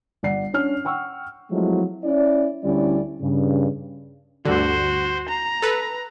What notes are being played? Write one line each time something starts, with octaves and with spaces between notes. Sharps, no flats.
G1 D5 F#5 C7
C#4 D4 C#5 F6
F#5 G5 C#6 E6
F3 F#3 G#3 A3 C4 E4
C#4 E4 D5
D2 D3 G3 C#4 E4 D5
G2 C#3
D2 G2 D3 F#4 C5
A#5
A4 B4